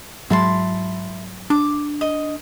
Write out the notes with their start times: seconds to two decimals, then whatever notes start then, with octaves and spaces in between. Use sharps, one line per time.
0.30 G#2 F#3 G#3 E4 A5 C6
1.50 D4 D6
2.01 D#5